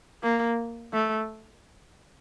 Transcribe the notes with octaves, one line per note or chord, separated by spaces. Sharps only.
A#3
A3